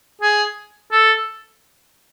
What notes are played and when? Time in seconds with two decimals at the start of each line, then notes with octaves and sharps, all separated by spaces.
0.22 G#4
0.92 A4